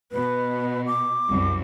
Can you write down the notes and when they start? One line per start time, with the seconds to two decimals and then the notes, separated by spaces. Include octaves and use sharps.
0.12 B2 B4
0.86 D6
1.28 C2 F#2